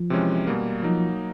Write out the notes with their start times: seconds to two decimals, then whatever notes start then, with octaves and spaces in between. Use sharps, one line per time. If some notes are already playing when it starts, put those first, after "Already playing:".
Already playing: F3
0.10 C3 E3 G#3 C#4
0.47 B2 G3 A#3
0.82 F3 F#3 A#3 D#4